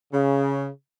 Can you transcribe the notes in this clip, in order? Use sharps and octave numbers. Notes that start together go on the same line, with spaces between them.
C#3